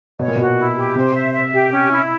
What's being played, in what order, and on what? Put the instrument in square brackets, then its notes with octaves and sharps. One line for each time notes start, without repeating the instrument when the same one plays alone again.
[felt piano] B2 [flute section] C#5
[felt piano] A#2
[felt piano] B2 [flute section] F#4
[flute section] E4
G4
[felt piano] C3 [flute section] C5
[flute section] E5
E5
G4
C#4
E4